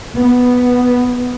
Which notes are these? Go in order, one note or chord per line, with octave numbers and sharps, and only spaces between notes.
B3